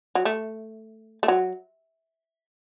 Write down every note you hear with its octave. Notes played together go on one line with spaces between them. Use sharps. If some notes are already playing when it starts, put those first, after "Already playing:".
F#3
A3
A3
F#3